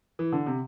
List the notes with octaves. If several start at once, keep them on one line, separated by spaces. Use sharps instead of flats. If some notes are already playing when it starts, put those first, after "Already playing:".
E3
D3
C3